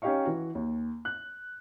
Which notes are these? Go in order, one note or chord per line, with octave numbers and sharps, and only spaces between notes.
C#4 D#4 G4 D#5 F5 C#6
E3 F#4
D#2
F#6